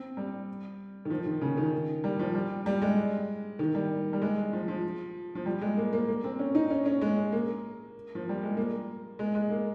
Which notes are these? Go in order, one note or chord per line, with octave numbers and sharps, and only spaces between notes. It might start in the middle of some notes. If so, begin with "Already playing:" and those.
Already playing: C4
G3
D#3
F3
D#3
C#3
D#3
G3
F3
G3
G3
G#3
D#3
G3
G3
G#3
F3
F3
F3
G3
G#3
A#3
A#3
A#3
C4
C#4
D#4
C#4
C#4
G#3
A#3
F3
G3
G#3
A#3
G#3
G#3
A#3